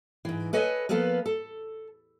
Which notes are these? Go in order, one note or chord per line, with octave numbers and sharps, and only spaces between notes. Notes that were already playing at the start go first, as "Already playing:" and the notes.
G#2 E3
A4 B4 C#5 D#5 G#5
F3 A#3 B3 A4 B4 F5
A4